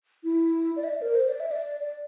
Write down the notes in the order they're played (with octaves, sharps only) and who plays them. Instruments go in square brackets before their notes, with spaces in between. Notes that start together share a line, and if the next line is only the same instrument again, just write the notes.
[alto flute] E4
D5
E5
D5
A#4
C5
D5
E5
D5
D5